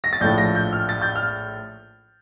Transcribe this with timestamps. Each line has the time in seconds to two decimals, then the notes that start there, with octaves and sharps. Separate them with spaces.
0.04 A#6
0.13 A6
0.21 A#1 A2 F3 G6
0.38 A#6
0.55 G6
0.73 F6
0.89 A6
1.02 G6
1.16 F6